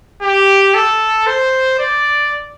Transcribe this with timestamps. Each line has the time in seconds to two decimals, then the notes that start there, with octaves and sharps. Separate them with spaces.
0.22 G4
0.74 A4
1.27 C5
1.79 D5